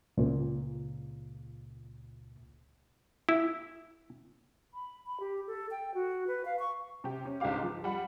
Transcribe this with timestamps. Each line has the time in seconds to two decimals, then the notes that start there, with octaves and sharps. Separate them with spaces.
0.17 C#2 A#2
3.29 E4
4.74 B5
5.07 B5
5.20 G4
5.47 A4
5.71 G5
5.94 F#4
6.27 B4
6.45 F5
6.59 C#6
7.04 C3 G4
7.25 C#4
7.40 C#2 G#2 D3 G4 F5 D6
7.63 F3
7.84 G3 F#5 B5